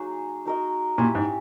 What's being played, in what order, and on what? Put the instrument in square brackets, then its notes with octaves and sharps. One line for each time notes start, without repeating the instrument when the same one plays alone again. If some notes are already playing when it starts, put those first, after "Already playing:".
Already playing: [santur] F#3 A#3 D#4 F#4 G#4 A#4
D#4 F#4 A#4 D#5
[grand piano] A#2 [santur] C#4 E4 G4
[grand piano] G#2